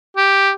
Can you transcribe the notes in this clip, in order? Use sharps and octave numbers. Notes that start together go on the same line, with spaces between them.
G4